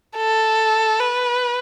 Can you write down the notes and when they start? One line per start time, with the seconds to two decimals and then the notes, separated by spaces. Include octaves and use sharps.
0.17 A4
1.00 B4